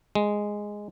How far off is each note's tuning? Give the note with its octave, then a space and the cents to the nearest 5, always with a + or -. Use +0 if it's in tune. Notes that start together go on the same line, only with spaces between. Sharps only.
G#3 -5